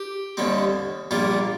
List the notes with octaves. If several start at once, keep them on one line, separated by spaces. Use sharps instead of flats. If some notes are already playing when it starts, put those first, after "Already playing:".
Already playing: G4
D#2 D3 G3 C4
A#1 A#2 G3 A#3 F4